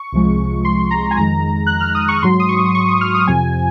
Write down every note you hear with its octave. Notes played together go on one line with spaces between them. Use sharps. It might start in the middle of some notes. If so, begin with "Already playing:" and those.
Already playing: C#6
C2 C3 F3 G#3
C6
A#5
G#5
F2 D#3 G#3 A#5
F#6
F6
D#6
C#6
G#2 F#3 C6
D#6
C#6
D#6
C#6
D#6
F6
D#6
F2 C3 F3 G#5